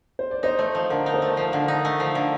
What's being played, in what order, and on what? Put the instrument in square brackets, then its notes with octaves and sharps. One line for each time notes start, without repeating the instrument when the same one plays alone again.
[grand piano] C5
D5
[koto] D#4 [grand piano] C5 D#5
[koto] A3
F3
[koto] D3 [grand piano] A#4 D5
[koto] D#4
[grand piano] A4 C5
[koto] A3
[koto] F3 [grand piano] A#4
[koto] D3
[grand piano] A#4
[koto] D#4
A3
F3
D3